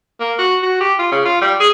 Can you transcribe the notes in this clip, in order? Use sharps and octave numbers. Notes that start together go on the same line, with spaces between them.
A#3
F#4
F#4
G4
F4
C#3
F4
G3
G#4